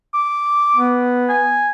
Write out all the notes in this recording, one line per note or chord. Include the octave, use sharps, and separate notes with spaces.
D6
B3
G#5